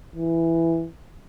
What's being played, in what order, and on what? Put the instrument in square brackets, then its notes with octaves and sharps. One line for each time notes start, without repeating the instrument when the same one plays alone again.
[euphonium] E3